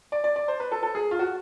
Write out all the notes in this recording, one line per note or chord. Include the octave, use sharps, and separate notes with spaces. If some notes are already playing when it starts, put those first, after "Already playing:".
D5
D5
D5
C5
B4
A4
A4
G#4
F4
F#4